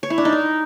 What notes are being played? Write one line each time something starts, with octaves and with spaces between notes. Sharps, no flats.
C#5
E4
D4
D#4
A#4